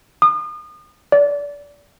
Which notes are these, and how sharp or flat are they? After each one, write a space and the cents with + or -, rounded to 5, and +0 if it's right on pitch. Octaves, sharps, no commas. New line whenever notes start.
D#6 -35
D5 -25